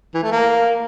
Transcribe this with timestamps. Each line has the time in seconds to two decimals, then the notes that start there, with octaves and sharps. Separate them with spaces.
0.14 E3
0.23 A3
0.32 A#3